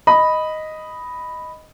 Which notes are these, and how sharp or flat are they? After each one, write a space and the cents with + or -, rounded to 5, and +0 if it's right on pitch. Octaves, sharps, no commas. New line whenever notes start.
D#5 +0 B5 +0